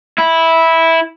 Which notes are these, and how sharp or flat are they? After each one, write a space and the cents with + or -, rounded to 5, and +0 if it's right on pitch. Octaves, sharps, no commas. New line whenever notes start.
E4 -10